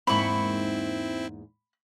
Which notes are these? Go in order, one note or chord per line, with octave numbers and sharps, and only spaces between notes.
E2 G#2 A#3 C4 E4 B5 C#6